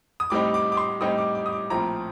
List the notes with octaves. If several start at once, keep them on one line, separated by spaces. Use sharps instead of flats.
D#6
A2 G3 C4 D#4 D6
D6
D6
C6
A2 G3 C4 D#4 D#6
D6
D6
D#6
D6
A#1 A2 F3 A3 C4 A#5